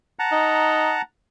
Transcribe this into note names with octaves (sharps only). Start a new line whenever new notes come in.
F#5 A5 A#5
D#4